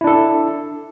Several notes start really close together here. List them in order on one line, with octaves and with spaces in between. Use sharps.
E4 D4 A4